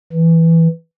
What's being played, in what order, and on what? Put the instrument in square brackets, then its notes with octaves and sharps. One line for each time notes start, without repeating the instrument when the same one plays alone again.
[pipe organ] E3